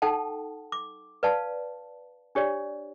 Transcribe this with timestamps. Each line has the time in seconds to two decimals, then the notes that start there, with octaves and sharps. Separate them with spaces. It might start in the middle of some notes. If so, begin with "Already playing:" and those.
0.02 D#4 A4 F#5 G5 A5
0.72 D6
1.23 B4 D5 F5 A5
2.35 D4 G4 C#5 D5